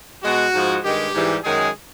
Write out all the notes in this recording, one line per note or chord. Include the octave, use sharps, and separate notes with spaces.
B2 G#3 F#4
G#2 F3 G#3
G2 D#3 G#3 G4
G#2 E3 G3
F#2 D#3 G#3 G#4